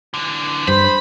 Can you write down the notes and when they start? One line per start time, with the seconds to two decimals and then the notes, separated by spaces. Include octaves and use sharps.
0.14 D3 E3
0.68 G2 C5 B5